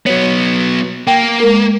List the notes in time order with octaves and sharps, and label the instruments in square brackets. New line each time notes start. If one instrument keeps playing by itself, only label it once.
[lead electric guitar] F#3 B3 [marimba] C#5
[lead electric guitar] A#3 [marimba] G5
[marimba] G#3 A#4